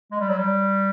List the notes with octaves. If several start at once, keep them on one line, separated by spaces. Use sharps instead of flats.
G#3
G3
F#3
G3